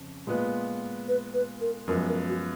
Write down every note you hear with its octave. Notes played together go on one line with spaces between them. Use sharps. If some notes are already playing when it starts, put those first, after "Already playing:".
Already playing: F2 C#3
A#2 G#3 B3 F4 B4
B4
B4
A#4
F#2 F3 G#3 B3 A#4
A#4
F#4